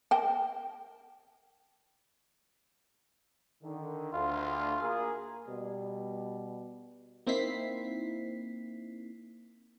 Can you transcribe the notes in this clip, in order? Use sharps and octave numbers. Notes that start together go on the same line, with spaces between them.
A#4 G5 A5
D3 D#3
D2 F4
A#3 G#4 A#4
B2 G3
A#3 C4 D#4 E4 B6 C7